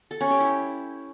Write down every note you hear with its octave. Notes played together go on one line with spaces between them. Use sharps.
A4
C#4
G4
E4